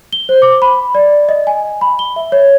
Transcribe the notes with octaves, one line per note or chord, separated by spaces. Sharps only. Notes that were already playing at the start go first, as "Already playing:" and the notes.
G7
C5
D6
B5
D5
D#5
G#5
B5
G7
E5
C#5